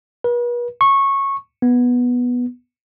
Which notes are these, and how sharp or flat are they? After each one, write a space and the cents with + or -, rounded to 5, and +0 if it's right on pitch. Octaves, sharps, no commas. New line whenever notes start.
B4 -40
C#6 -15
B3 -10